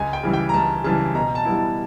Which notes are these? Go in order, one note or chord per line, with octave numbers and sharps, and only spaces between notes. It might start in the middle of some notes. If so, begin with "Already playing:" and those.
Already playing: C#2 G#5
G5
C#3 E3 G3
G5
A#5
C#2 A5
C#3 E3 G3 A5
B2 A#5
A5
G3 B3 E4
A5